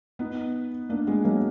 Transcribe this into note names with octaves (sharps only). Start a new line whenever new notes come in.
B3 D#4
A#3 D4
G#3 B3
F#3 A#3